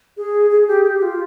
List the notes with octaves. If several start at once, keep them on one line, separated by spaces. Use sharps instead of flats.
G#4
G#4
G4
G4
F4